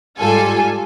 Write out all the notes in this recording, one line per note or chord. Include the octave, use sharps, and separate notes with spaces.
G#2 G3 F4 A4 G#5